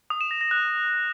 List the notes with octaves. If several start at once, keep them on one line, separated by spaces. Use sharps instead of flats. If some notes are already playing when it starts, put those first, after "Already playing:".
D#6
E7
A#6
A#6
F#6